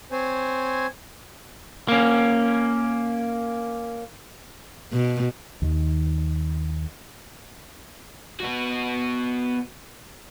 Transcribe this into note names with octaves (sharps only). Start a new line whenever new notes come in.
C4 C5 C#5 G#5
A#3 C#4
B2
D#2 D#3
B3 F#4